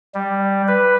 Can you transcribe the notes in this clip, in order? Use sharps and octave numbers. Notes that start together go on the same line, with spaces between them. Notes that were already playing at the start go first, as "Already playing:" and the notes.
G3
B4